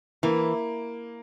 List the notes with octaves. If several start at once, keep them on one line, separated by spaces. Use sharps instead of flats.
E3 A#3